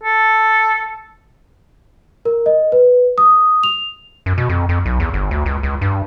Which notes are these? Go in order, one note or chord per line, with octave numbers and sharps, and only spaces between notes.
A4
A#4
D#5
B4
D#6
F7
F#2
B2
F2
F2
B1
E2
G1
D2
C#2
C#2
G2